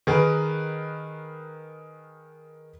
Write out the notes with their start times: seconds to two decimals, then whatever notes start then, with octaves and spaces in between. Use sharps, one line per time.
0.07 D#3 G#4 A#4 B4